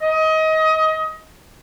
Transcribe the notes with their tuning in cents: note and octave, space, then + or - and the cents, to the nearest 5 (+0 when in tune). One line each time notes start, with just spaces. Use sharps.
D#5 +25